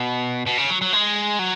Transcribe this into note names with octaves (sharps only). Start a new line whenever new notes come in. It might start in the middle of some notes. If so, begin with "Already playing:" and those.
Already playing: B2
B2
C#3
F#3
F#3
G#3
F#3